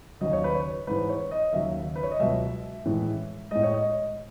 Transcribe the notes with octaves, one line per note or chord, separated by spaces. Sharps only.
D#2 C#3 F#3 D#5
C#5
B4
C#5
G#2 E3 G#3 B4
C#5
D#5
D#2 C#3 F#3 E5
B4
C#5
D#5
C#2 B2 F#3 E5
A2 E3 G#3
A2 G#3 D#5
C#5
D#5